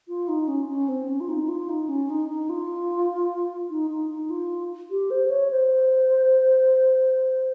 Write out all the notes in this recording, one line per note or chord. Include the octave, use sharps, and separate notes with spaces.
F4
D#4
C#4
C#4
C4
C#4
F4
D#4
F4
D#4
C#4
D#4
D#4
F4
D#4
D#4
D#4
F4
G4
C5
C#5
C5